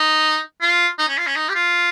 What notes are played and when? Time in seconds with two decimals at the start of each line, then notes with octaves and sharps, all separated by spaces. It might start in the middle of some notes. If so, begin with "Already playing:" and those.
Already playing: D#4
0.61 F4
0.99 D#4
1.08 C#4
1.18 F4
1.27 C#4
1.36 D#4
1.49 G4
1.55 F4